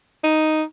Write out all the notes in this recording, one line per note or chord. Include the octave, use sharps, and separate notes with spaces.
D#4